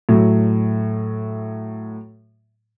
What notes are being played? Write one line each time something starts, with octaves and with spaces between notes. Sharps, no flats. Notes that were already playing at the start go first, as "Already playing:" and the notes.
A2 F#3